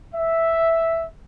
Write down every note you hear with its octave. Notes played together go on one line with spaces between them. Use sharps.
E5